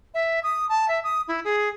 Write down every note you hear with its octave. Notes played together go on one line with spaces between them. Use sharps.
E5
D#6
A5
E5
D#6
E4
G#4